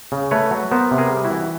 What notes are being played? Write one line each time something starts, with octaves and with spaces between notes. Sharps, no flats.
C#3
A3 B4 C#5
F#3
B3 A#4 C5
C3
G#4 A#4
G3
E4 F#4
E3